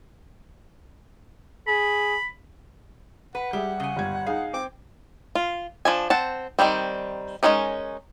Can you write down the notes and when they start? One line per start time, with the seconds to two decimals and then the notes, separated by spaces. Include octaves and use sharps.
1.67 G#4 B5
3.35 B4 F#5
3.53 G3 G4 G#4 E5
3.80 C#3 G#5
3.96 G1 G3 G#6
4.27 D#4 G#4 F5
4.54 C4 G5 D6
5.35 F4
5.85 F3 D4 G#5
6.10 C4 F#5 A5
6.59 D#3 F3 G3 C4
7.43 G#3 A#3 C#4 D#4 A#4